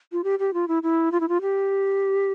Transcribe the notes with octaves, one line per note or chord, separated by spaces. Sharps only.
F4
G4
G4
F4
E4
E4
F4
E4
F4
G4